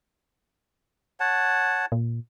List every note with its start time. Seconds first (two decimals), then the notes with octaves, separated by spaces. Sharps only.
1.20 C#5 F#5 A5
1.92 A#2